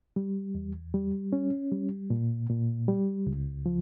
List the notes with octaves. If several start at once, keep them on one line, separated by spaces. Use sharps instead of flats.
G3
E2
G3
C#4
G3
A#2
A#2
G3
C#2
F3